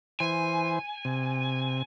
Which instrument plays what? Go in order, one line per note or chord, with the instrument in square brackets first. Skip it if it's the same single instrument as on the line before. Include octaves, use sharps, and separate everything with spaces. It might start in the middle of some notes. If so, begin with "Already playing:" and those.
[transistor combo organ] E3 C5 [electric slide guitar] G#5
[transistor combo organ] C3